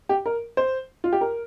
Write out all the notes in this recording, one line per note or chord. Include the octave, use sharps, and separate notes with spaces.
G4
A#4
C5
F4
G4
A#4